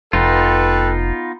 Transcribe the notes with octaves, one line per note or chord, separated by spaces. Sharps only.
F1 B3 D#4 F4 A4 B4 G5